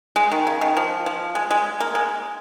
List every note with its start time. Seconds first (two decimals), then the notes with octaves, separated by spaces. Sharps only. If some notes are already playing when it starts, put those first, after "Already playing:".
0.16 G#3
0.32 D#3
0.47 C#3
0.61 D#3
0.77 F3
1.06 F3
1.35 G#3
1.51 G#3
1.80 A#3
1.95 G#3